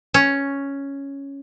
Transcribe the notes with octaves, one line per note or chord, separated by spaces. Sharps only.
C#4